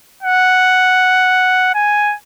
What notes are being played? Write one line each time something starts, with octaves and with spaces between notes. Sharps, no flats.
F#5
G#5